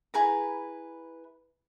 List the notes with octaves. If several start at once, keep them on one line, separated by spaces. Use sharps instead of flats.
E4 G#4 B4 A#5